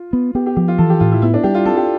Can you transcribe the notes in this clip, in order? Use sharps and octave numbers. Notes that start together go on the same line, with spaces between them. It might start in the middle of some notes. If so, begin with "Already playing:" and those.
Already playing: F4
B3
B3 G4
G4
F3 G4
F4
E3 A4
G4
A2 F4
E4
B3 E4
D4
G3 G4
F4
C4 A4
G4